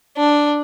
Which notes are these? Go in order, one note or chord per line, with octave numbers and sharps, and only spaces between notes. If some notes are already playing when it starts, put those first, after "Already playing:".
D4